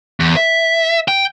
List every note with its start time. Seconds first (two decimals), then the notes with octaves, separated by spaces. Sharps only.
0.20 E2
0.37 E5
1.08 G5